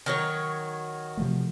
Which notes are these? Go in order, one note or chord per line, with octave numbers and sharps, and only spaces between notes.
D#3 F#3 C#5
C3 F3 A3